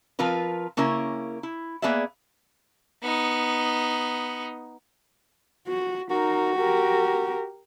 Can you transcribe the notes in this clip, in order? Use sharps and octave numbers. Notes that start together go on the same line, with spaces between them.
F3 C4 F4 A#4 B4
C#3 A#3 C#4 E4 A#4
E4
A#3 B3 G#4 B4 D5 E5
B3 D#4
F#4
D#4 F#4 A#4
G4 A#4